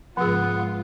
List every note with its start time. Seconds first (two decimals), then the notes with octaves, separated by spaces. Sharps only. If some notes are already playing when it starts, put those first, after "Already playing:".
0.17 G#1 C#2 F3 B3 F4 G#4 F#5